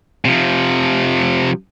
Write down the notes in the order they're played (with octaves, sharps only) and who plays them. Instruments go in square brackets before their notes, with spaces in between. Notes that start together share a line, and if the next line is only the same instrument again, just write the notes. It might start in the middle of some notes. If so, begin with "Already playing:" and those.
[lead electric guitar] C3 F3